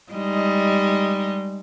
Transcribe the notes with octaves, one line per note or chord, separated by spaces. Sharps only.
G3 G#3 D#4